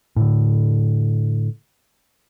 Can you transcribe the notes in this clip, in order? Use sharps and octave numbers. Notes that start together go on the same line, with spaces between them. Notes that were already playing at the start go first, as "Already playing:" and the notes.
A2 D3